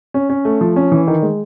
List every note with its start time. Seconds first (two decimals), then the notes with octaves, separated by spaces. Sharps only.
0.14 C#4
0.30 C#4
0.45 A3
0.61 F3
0.76 C#4
0.92 E3
1.07 D#3
1.22 G#3